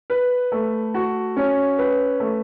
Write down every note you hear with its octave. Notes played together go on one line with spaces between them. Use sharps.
B4
A3
F#4
C#4
B4
A3